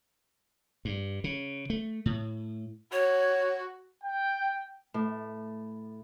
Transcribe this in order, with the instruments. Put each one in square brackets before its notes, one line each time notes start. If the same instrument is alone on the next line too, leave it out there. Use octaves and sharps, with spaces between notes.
[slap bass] G2
C#3
A3
A2
[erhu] F#4 [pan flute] C#5
[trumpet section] G5
[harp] A2